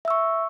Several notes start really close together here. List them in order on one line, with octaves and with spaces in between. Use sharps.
E5 E6 C#6